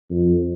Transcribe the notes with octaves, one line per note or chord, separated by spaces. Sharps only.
F2